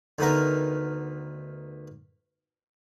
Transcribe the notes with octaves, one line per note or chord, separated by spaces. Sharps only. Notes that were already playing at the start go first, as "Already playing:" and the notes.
D2 D#3 B3 A#4